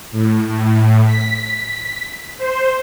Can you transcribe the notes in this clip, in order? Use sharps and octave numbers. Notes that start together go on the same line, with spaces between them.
A2
A2
B6
C5